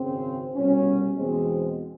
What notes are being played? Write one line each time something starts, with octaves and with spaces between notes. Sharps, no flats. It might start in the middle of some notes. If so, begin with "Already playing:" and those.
Already playing: G#1 F#2 C#3 C4
C2 B2 G3 C#4
E2 B2 G#3 C4